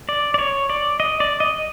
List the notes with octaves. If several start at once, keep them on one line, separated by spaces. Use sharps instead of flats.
D5
D5
C#5
D5
D#5
D5
D#5